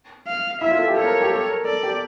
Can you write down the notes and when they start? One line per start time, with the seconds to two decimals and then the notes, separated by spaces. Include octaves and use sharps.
0.27 F5
0.61 E4 E5
0.71 F4
0.79 A4
0.88 G4
0.96 A4 C#5
1.05 A#4
1.22 G4
1.31 A4
1.49 A#4
1.65 A4 D5
1.83 G4